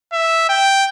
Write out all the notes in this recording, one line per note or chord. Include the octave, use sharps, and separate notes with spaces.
E5
G5